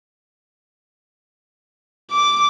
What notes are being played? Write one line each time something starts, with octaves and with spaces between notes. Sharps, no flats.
D6